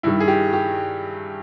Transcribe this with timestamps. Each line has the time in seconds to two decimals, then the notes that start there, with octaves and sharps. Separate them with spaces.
0.03 G2 D#3 G3 E4
0.20 G#4
0.28 G4
0.53 G4